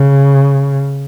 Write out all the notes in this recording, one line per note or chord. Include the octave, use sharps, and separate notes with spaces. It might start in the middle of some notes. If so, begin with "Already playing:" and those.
Already playing: C#3